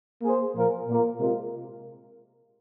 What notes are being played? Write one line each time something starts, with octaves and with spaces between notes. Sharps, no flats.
A#3 G#4 C5
A#2 F3 A#3 F4 A#4
A#2 A#3 F4 A#4
C3 G#3 F4 A#4